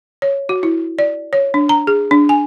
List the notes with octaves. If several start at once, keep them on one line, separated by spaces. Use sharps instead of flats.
C#5
F#4
E4
D5
C#5
D4
A#5
G#4
D4
G#5